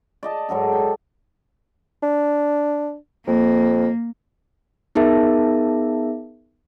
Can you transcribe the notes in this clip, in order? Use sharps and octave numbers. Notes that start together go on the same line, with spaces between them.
D5 D#5 A5
G#2 F#3 A4 A#5
G5
D4
F2 A#3
B3 D#4 G#4 A#4 E5 A5